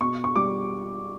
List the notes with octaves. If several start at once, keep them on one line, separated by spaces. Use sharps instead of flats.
B2 C#6
C#6
G3 D6